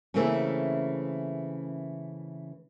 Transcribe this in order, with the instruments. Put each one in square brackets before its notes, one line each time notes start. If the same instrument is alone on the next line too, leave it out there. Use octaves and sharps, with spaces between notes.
[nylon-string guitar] C#3 E3 A3 A#3 C4 C#4